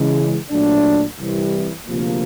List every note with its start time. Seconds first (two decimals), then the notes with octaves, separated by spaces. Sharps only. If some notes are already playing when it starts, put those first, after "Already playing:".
Already playing: C#3 E3 G#3
0.50 A#2 F#3 A3 D4
1.18 C2 C3 E3 G3
1.87 D2 C3 F3 A#3